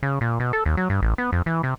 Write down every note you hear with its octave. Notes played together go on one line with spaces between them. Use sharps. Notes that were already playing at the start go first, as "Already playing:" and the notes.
C#3
A#2
B2
A4
D#2
F#3
G2
A1
B3
F2
E3
C3